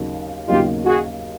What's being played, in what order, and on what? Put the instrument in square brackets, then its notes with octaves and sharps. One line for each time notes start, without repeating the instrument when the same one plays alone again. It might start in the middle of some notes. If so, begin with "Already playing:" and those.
Already playing: [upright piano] D#2 C#3 F#3 A#3 D#4
[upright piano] D#2 C#3 F#3 A#3 D#4 [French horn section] F4 G4
[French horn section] F#4 G#4